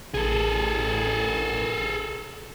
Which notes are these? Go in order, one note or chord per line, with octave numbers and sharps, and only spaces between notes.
A1 G#4 A4